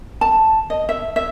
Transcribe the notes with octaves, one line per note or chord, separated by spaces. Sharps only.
A5
D#5
E5
E5